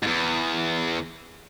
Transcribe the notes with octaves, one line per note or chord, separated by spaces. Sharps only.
E2 G#2